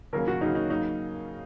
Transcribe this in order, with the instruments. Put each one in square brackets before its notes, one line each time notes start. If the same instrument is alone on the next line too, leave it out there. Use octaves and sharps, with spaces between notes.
[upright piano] D#2 C#3 F#3 A#3 C#4 [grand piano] A#4
[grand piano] F#4
[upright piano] D#2 C#3 F#3 A#3 C#4 [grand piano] D#4
[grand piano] D#4
[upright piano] C#3 F#3 A#3 [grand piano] D#4